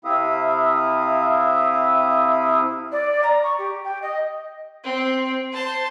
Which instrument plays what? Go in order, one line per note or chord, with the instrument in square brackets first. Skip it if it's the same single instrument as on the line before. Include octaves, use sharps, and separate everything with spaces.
[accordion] C3 C4 E4 E5 F5 D#6
[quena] D5
A#5
C#6
G4
G5
D#5
[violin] C4
C5 A5